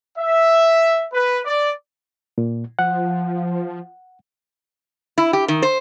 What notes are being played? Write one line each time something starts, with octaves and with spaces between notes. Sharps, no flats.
E5
B4
D5
A#2
F3 F#5
E4
G4
D#3
C5